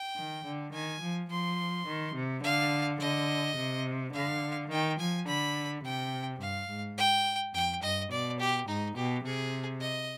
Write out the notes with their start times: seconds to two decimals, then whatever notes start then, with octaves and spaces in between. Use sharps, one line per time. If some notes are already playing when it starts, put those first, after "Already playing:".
Already playing: G5
0.17 D#3
0.45 D3
0.73 D#3 G#5
1.02 F3
1.30 F3 C6
1.87 D#3
2.15 C3
2.43 D3 F5
3.00 D3 D#5
3.57 C3
4.13 D3 F5
4.71 D#3 G5
4.99 F3 G#5
5.27 D3 B5
5.84 C3 G5
6.41 G2 F5
6.70 G#2
6.97 G5
7.54 F2 G5
7.82 G2 D#5
8.11 B2 D5
8.39 G4
8.68 G#2 D#4
8.96 B2 G4
9.24 C3 G#4
9.81 D#5